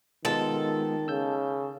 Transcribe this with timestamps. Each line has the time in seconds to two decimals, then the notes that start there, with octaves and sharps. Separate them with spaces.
0.25 D#3 G#3 B3 F4 A4
1.08 C#3 E6 G6